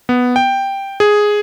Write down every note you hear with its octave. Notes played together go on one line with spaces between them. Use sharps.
B3
G5
G#4